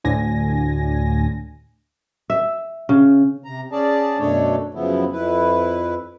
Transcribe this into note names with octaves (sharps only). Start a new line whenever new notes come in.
D2 A2 D3 G#5 A#6
E5
C#3
C3 A#5
C#4 G#4 D5 A5
F#2 B2 A3 D4 A4 C#5
F#2 C#3 F3 B3 E4
F2 E4 B4